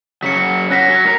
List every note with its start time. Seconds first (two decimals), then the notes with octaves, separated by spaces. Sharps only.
0.23 F#2 C#3 F#3 B6 C#7
0.70 C#4 F#4 F#6 A#6 B6
0.89 F#3
1.04 A2 A#4 A#5